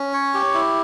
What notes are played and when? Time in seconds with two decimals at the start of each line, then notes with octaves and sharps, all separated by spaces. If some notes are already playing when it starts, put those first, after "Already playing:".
Already playing: C#4
0.13 C#5
0.34 G4
0.54 E4